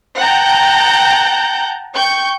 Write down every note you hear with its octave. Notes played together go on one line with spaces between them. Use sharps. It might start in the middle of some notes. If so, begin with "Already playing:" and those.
F#5 G5 A5 A#5 G6
G5 C#6 G6